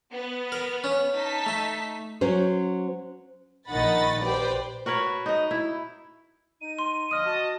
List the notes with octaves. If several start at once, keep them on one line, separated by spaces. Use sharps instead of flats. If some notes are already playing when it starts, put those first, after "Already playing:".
B3
A#4
C#4
D#4 A5 B6
A3 E5
F#3 C#4 C5
A#1 D#3 D#5 F#5 B5 A6
G4 B4 C5 D5 G5
F#4 A#4 B4 C#5
D#4 D#5
E4
D#4 D#7
C6
D3 F3 A#3 D#5 D#6 F6
F#4 A5